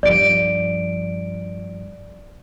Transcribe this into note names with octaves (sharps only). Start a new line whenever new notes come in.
G2 F3 D5 D7